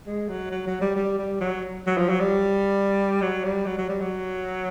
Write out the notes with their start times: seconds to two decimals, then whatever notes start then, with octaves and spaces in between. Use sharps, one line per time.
0.07 G#3
0.29 F#3
0.51 F#3
0.67 F#3
0.81 G3
0.96 G3
1.19 G3
1.41 F#3
1.87 F#3
1.97 F3
2.09 F#3
2.20 G3
3.22 F#3
3.44 G3
3.67 F#3
3.78 F#3
3.89 G3
4.01 F#3